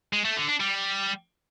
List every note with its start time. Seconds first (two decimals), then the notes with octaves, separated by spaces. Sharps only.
0.13 G#3
0.25 A3
0.37 D3
0.49 D4
0.60 G3